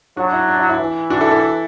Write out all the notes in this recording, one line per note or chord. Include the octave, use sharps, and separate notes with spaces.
F#3 D4 F#4
E4
D4
E4
E4
E3
D4 F#4
E4 A4
E4 A4